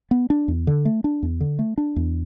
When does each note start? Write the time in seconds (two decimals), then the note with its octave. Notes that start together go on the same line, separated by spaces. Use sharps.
0.11 B3
0.30 D4
0.48 E2
0.67 D3
0.85 A3
1.04 D4
1.23 E2
1.41 D3
1.59 A3
1.78 D4
1.96 E2